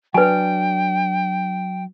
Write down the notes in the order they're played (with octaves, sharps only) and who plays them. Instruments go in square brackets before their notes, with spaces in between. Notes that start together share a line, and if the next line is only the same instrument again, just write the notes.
[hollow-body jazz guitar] F#3 D4 [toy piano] B4 G#5 [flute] G5